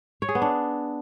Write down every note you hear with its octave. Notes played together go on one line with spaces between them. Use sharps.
C#5
G#4
B3
D4